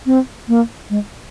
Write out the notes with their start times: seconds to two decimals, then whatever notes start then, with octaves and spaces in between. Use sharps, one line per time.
0.06 C4
0.48 A#3
0.90 G#3